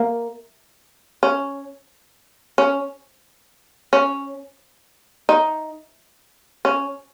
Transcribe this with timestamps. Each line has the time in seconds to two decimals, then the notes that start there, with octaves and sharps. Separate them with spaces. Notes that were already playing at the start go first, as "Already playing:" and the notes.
Already playing: A#3
1.23 C#4
2.58 C#4
3.93 C#4
5.29 D#4
6.65 C#4